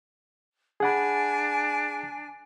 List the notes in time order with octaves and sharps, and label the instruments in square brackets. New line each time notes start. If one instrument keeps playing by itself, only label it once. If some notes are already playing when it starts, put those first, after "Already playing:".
[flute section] D4 G#5 [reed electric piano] G#4 F#5 B5